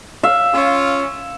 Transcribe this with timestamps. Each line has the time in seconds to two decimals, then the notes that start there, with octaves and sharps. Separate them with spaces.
0.23 E5 F5
0.54 C#4 F4 E6